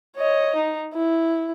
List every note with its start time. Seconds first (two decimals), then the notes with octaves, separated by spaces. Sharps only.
0.16 C#5 D#5
0.56 D#4
0.94 E4